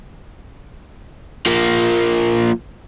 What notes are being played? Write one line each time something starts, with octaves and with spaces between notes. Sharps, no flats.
F3 A#3